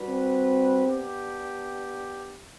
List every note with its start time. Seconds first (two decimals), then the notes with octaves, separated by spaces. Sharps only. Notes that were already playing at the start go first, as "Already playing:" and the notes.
Already playing: G3 D4 F#4 B4
0.09 C4
0.86 B3 D4 G4